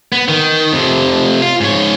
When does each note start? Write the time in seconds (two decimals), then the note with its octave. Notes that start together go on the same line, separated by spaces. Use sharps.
0.12 B3
0.29 D#3
0.72 F2 C3
1.42 F4
1.61 G#2 C#5